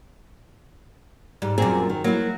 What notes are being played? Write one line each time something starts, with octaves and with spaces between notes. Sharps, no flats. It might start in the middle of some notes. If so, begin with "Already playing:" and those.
G#2 G3
F#2 A#2 C4 G#4
D#3
F#3 A#3 E4